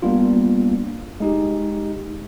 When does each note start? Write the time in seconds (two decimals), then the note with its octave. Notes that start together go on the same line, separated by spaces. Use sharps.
0.02 G3 A#3 B3 D4 F4
1.20 G#3 D#4 G4